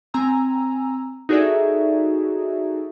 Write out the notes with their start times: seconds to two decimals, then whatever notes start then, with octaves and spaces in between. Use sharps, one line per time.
0.14 C4 G#5 A#5 E6
1.29 D#4 F#4 G#4 A4 D5 E5